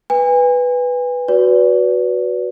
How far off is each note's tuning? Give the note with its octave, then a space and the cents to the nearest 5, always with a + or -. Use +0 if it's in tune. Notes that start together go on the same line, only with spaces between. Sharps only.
B4 +0 G#5 -35
F#4 +0 B4 +0 D5 -30